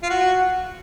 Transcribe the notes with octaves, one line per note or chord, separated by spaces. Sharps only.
F4
F#4